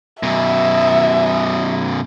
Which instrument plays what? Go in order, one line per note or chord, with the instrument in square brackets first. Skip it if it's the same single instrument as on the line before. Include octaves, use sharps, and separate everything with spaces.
[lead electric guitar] F#2 B2 [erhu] E5